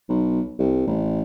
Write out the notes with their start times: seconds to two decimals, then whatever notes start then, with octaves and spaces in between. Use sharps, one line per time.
0.09 B1
0.59 C2
0.87 A1